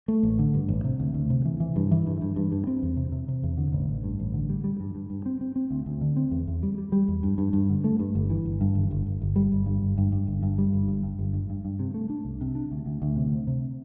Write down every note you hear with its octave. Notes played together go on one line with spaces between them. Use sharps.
A3
A1
D3
G2
A1
C3
D2
D2
C3
E3
E3
G2
E3
G2
G2
G2
G2
C4
E2
C3
C3
C3
E2
D3
A1
A1
G2
A1
D3
G3
G3
G2
G2
G2
C4
C4
C4
D2
D2
D3
C4
E2
E2
G3
G3
G3
E2
G2
G2
G2
D3
A3
G2
G1
E3
G1
G2
G1
G1
G1
G1
G3
G1
G2
G1
G2
G2
G1
G2
G3
G1
G2
G2
G1
G2
G2
G2
C3
A3
D4
C2
C3
D4
D2
D2
D2
C3
C3
C3